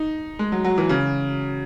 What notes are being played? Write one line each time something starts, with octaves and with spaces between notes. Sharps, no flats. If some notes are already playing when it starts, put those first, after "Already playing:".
Already playing: D#4
G#3
F#3
F#3
E3
C#3